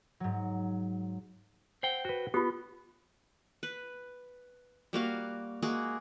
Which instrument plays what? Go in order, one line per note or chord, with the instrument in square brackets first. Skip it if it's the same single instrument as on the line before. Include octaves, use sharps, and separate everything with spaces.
[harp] G#2 F#3
[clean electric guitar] C5 F#5 G5
[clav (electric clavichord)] F#4 B4
[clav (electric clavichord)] B3 [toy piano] F4 G4
[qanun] B4
G3 A#3 F#4 F5
G#3 A#3 F#4 G#4